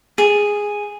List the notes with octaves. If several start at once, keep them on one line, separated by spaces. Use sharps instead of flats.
G#4